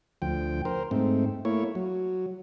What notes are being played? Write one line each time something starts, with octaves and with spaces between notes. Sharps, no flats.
D2 F3 G5
A#4 C5
G#2 A3 C4
A3 A#3 E4 C#5
F#3